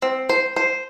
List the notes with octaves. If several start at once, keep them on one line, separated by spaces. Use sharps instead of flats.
C4
C5
C5